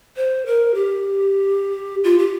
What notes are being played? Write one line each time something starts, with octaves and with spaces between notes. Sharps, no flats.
C5
A#4
G4
F4
G4